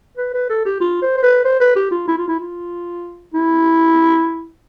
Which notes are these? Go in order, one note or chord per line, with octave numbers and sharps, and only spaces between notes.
B4
B4
A4
G4
F4
C5
C5
B4
C5
B4
G4
F4
E4
F4
E4
F4
E4